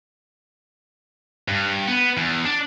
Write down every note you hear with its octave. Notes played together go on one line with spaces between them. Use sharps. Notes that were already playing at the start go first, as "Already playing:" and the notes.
G2
B3
E2
D4